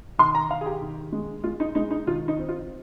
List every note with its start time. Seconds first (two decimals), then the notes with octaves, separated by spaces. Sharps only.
0.19 D#3 C6
0.35 A#5
0.50 D#3 F5
0.61 G#4
0.66 G4
0.81 D#3
1.12 G#3
1.44 G#3 F4
1.60 D#4
1.75 G#3 D#4
1.91 D#4
2.07 D#3 F4
2.28 D#4
2.38 C4
2.49 F4